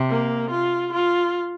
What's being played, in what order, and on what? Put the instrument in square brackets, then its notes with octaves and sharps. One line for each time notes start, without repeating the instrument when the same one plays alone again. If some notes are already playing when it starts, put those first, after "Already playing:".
Already playing: [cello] C3
[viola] A#3
F4
F4